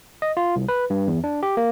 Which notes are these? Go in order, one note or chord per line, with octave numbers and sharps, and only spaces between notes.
D#5
F4
C2
B4
G2
E2
D4
G4
A#3